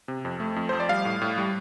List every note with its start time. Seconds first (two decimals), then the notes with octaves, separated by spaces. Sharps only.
0.08 C3
0.25 F2
0.40 A3
0.56 F2
0.69 F3 C5
0.80 D5
0.89 G3 F5
1.05 A2
1.21 A2
1.38 G3